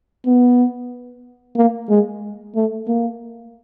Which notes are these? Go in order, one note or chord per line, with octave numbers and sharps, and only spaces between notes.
B3
A#3
G#3
A3
A#3